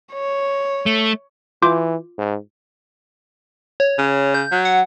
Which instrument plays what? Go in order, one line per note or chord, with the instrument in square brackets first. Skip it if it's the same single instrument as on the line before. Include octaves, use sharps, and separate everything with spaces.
[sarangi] C#5
[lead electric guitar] A3
[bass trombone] E3 [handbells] F4 D6 G6
[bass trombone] G#2
[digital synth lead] C#5
[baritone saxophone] C#3
[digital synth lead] G6
[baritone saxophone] F#3
[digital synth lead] F#5